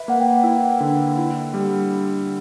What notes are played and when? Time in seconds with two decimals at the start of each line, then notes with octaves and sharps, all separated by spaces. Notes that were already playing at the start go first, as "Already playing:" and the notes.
Already playing: B4 E5
0.08 A#3 F#5
0.20 G5
0.43 E4 F#5
0.80 D3
1.18 E4
1.54 G3